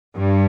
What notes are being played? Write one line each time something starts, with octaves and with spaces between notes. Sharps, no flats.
G2